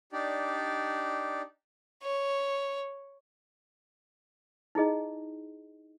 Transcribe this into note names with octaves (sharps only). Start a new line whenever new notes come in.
D4 D#4 G4 D5
C#5
D#4 E4 G#4 D#5